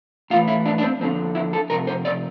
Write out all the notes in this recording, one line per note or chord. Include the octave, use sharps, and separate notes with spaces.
A2 E3 F4
E4
D4
D4
C4
F2 D3 C4
E4
A4
F2 C3 A#4
C5
D5